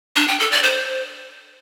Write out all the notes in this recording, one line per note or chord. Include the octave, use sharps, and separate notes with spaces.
D4
G5
A4
D5
C5